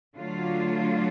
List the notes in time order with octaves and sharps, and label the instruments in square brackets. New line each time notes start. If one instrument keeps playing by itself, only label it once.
[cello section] D3 F#3 A3 D4 F4